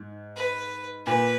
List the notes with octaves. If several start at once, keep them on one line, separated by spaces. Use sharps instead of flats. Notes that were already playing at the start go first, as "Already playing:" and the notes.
Already playing: G#2
B4
A#2 B4